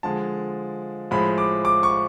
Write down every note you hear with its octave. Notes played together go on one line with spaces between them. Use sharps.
D3 F3 G#3 A5
A2 F3 G#3 B5
D6
D6
C#6